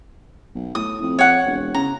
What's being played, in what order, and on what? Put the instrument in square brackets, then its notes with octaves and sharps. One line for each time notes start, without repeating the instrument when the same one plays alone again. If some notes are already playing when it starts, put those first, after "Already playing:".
[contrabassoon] B1
[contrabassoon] A2 [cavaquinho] D#6
[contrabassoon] F2
[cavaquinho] C#5 F#5
[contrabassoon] E1
[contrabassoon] C#3 [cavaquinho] A#5